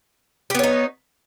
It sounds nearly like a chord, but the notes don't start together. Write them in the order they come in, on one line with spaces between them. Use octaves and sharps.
G4 B3 C#5 D#4